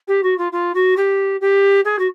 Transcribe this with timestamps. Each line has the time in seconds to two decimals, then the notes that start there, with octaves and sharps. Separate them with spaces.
0.08 G4
0.23 F#4
0.38 F4
0.52 F4
0.74 F#4
0.96 G4
1.41 G4
1.85 G#4
1.99 F#4